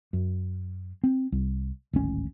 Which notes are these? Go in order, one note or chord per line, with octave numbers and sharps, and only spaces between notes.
F#2
C4
C2
D1 G#1 C#4